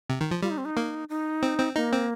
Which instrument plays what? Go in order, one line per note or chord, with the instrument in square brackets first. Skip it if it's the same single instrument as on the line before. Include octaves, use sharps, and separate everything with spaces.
[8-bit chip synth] C3
D#3
F3
[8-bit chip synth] G3 [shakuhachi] F4
[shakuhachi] D#4
C4
D#4
[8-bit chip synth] A#3
[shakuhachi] D#4
[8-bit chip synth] C4
C4
[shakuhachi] A#3 [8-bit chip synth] D#4
[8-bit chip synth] C4